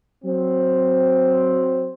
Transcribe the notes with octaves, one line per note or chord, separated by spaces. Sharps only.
F#3 C4